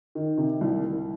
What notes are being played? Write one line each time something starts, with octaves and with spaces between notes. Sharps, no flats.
D#3
C3
C2
C2